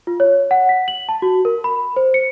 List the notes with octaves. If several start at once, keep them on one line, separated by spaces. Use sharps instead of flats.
F4
C#5
F#5
B6
F#7
A5
F#4
A#4
B5
C5
C#7